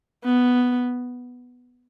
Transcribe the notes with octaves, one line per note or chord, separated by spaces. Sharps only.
B3